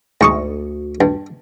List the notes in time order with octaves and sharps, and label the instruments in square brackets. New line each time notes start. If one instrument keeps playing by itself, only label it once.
[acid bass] D2 [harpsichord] G#2 C#6 D#6
[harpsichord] G2